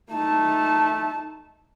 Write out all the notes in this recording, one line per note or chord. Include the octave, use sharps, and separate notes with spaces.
A3 D#4 A5